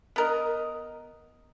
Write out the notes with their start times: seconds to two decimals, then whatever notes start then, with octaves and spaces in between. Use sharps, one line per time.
0.16 B3 A#4 D#5